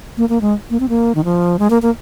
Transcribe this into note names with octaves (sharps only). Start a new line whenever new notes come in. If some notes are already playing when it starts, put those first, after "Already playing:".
A#3
A#3
G#3
A#3
C4
A#3
D#3
F3
G#3
A#3
A#3